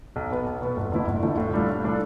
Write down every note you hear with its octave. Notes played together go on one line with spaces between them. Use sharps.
B1
B2 B3
B1
B2 B3
G1
F2 D3 A3 E4
G1
F2 D3 A3 E4
A2
G3 D4 F4 A4
A2
G3 D4 F4 A4